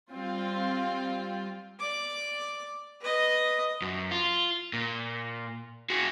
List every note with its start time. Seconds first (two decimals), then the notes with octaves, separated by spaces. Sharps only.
0.11 G3 C4 F4
1.79 D5 D6
3.01 B4 D#5
3.82 F#2
4.11 F4
4.73 A#2
5.90 F#4 G#4